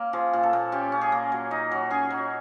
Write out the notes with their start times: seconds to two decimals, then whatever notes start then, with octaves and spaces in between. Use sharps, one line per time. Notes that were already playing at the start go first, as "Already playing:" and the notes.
Already playing: A#3 C#4
0.13 F3 G#4
0.33 A#2
0.43 A4
0.53 A#2
0.72 C#4 G4
0.92 C#4
1.01 G#4
1.12 A#3
1.32 F#3
1.51 D#4
1.71 F#3
1.90 C#4 G#4
2.10 F#3